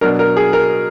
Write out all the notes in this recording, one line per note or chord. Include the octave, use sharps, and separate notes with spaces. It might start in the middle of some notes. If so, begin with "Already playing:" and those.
B2 F#3 D4 A#4
A#4
G#4
A#4